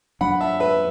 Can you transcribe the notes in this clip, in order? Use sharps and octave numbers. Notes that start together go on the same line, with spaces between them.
F#2 F#3 D4 F#5 B5
E5 A5
B4 E5